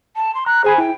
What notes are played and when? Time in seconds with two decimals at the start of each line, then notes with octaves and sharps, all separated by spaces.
0.16 A5
0.35 C6
0.46 A#5 F#6
0.64 G#4 C5 G#5 B5
0.78 E4 G5